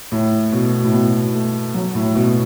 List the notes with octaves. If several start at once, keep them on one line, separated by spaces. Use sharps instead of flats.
A2
B2
A2
B2
A3
F#3
A2
B2